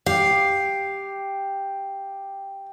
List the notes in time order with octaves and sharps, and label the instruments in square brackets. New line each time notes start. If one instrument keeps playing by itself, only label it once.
[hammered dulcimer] G4 [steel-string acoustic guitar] F5